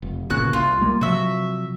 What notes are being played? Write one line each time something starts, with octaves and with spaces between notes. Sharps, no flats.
F1
G1 A#2 C#3 F#4 F#6
C2 F4
G3 A#3
C3 F3 F#3 F#4 E5